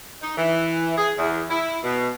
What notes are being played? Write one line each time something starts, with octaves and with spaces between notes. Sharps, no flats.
D#4
E3
G#4
E2
E4
B2